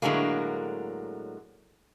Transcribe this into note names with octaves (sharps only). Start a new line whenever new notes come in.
A2 D3 F#3 G#3 A#3